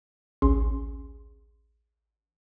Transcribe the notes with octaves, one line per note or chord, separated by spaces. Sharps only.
A1 D2 C#4 G#4 C6